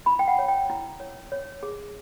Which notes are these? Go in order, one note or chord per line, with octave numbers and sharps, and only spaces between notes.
E4 B5
G5
F#5
C#5
G5
E4
C#5
C#5
G#4